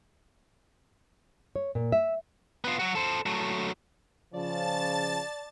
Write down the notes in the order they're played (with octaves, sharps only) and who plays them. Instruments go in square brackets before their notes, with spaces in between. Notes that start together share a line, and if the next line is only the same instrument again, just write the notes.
[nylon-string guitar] C#5
A#2
E5
[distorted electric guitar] B3 F4
F#3 F#4
A4 C5
F#3 A3
[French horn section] C#3 F3 [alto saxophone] D5 [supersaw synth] A5 A6